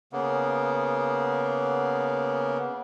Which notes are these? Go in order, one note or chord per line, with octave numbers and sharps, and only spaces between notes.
C#3 A#3 B3